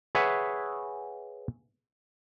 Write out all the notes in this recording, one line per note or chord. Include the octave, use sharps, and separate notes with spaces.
G#4 B4 C#5 E5 F#5